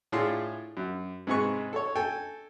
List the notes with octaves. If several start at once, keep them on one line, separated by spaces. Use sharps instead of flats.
A2 D4 E4 F4 G#4 C6
F#2
G#2 C3 D#4 G#4 B4 C#6
A4 C#5
A4 G5 G#5